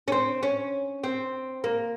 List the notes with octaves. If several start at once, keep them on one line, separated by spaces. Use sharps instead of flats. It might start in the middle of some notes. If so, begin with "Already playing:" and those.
C#4
C4
C#4
C4
A#3